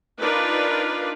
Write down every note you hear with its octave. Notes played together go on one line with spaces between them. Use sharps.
D4 D#4 F4 A#4 B4 D5